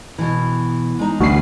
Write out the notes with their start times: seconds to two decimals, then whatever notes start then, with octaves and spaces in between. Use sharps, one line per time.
0.18 B2 E3
0.99 G#3 D#4
1.20 D2 E3 G3 F#4 B4 C7